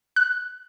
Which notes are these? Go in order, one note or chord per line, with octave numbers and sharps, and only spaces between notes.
F#6